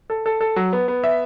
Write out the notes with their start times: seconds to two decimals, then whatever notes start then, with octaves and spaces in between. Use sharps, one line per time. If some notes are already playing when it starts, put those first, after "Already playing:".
0.10 A4
0.26 A4
0.41 A4
0.56 F#3
0.73 B3
0.88 B3
1.04 E5